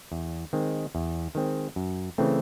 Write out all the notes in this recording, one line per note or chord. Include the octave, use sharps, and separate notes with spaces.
E2
D#3 G#3 C4
E2
D#3 G#3 C4
F#2
C#3 E3 A3 C4